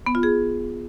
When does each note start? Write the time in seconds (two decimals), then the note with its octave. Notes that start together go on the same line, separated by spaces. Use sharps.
0.06 B3
0.15 F4
0.23 G#4